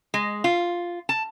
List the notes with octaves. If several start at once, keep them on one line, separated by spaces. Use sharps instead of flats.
G#3
F4
A5